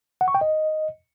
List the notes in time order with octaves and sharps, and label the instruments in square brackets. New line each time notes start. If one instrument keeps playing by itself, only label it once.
[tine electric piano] F#5
C#6
G5
D#5